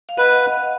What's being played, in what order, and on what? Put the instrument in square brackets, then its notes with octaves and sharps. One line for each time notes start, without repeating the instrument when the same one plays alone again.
[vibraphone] F5
[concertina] B4 [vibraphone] D#5 F#5